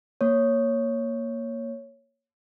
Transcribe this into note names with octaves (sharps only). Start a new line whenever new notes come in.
A#3 C#5